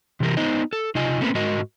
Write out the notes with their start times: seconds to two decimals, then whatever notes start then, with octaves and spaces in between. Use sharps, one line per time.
0.20 C3 E3 G4 A#4
0.37 B3 D#4 C5 D#5
0.73 A4
0.95 C3 D#4 F4 D#5 G#5
1.21 A3 A#3 C4 C#4 B4
1.35 G#2 G#3 F#4 A#4 D#5